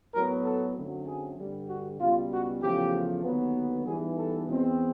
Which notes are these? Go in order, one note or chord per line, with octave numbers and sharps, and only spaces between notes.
A2 F#3 B3 A#4
A4
F#2 D3 F#3 A3 C4
G#4
G2 D3 G3
F#4
C#2 B2 G3 F4
F#4
E2 C#3 F3 A3 G4
D#2 D3 F#3 B3
G#2 E3 G3 B3 G#4
A4
E2 B2 G#3 C4